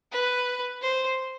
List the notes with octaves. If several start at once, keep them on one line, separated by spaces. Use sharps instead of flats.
B4
C5